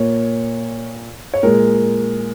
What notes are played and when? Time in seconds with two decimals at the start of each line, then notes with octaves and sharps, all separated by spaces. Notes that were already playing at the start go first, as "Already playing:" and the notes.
Already playing: A#2 A#3 C#5
1.34 C#5
1.43 A#2 G#3 A#4